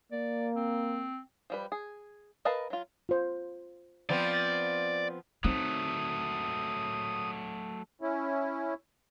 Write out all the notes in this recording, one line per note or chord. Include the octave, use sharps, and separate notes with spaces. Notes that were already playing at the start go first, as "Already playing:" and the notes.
A#3 D5
C4
F3 G3 B4
G#4
A#4 B4 D#5 F5 A5
F#3 F4
F4 C5
F3 B3 C4 D5
F#3 A3 C4 D#4 D#6
C#4 E4